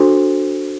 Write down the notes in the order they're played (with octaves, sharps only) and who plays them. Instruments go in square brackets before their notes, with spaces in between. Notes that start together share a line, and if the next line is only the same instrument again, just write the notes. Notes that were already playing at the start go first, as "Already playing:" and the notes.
Already playing: [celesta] D4 F#4 A4 C5